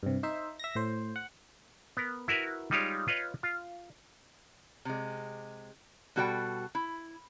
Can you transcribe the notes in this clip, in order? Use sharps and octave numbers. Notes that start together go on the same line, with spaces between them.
G2 C3
D#4 C5 E5
E5 A#6
A2 C5
F#5
B3 A#4
E4 F#4 A#4 B4 E5
G3 G#3 D#4 F4 G4 C#5
F4 B4 C#5 D#5
F4
C3 G#3
B2 G3 F#4 A4 D5 G5
E4